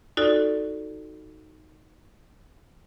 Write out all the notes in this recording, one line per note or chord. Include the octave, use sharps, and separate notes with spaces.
D#4 F4 F#4 A4 D5